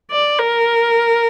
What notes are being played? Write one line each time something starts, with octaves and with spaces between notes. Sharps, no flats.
D5
A#4